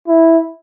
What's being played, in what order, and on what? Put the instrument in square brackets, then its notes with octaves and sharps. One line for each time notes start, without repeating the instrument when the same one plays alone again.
[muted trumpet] E4